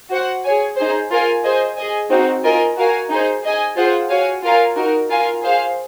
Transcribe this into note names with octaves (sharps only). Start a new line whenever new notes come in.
F#4 C5 F#5
G#4 C#5 G#5
D#4 G#4 C5
F4 A#4 F5 G#5
G#4 C5 D#5 G#5
G#4 D#5 G#5
C4 D#4 F#4
F4 A#4 D#5 G#5
F#4 A#4 F5 G#5
D#4 G#4 C5
G#4 D#5 G#5
F4 G#4 C5 F#5
F#4 C#5 F5 G#5
F4 A#4 F5 G#5
D#4 F#4 A#4
F4 A#4 F5 G#5
G#4 C5 F5